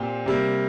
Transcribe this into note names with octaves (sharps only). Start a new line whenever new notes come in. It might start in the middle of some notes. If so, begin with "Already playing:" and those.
Already playing: A#2 C4 G4 C5
C3 G3 A#3